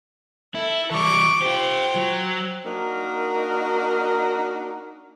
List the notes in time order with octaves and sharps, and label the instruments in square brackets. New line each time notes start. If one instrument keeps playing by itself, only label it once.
[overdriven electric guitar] E4 [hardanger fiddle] A4
[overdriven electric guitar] E3 G3 [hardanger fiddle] C#6 D6
[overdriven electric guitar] F4 G4 [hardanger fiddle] C5 G5
[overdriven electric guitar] F#3
[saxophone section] A#3 D4 D#4 F#4 A#4